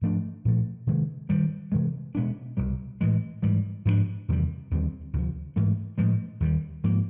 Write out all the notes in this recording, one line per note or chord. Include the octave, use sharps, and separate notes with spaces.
G#2 F3 A3 D4
A#2 F3 A3
C3 D#3 G#3
G2 D#3 G3
C3 E3 G#3
B2 G#3 B3 D4
C2 B2 G3
A2 E3 G#3
G#2 E3 G3
G#2 F3 A#3 D4
E2 C3 D#3 G3
D#2 D3 G3 C4
D2 C3 F3
G#2 E3 A3
A2 F3 G#3
D#2 D#3 G3
G#2 F3 A#3